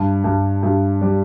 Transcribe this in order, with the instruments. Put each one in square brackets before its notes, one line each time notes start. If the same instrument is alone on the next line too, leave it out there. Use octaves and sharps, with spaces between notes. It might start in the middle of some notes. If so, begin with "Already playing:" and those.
Already playing: [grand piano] G2
G2
G2
G3